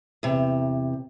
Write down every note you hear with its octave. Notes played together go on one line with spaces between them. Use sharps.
E2 C3